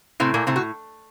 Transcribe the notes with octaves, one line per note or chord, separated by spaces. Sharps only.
A2 C3 C4
A#2 A#3
A2 C3 C4
F#4